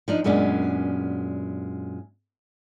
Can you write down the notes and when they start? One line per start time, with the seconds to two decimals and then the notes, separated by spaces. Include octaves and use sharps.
0.08 F3 D4 D#4
0.24 F#2 A#2 G#3 B3 C#4 D4